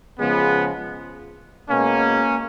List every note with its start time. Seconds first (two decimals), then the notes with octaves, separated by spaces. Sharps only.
0.19 C#3 F3 G#3 B3
1.70 B2 G#3 A#3 C#4